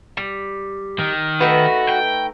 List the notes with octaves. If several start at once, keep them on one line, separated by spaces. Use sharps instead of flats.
G3
D#3
A3 D#4 F#4 B4
G5